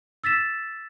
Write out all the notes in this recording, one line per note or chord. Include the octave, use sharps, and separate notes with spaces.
E6 A6 B6 E7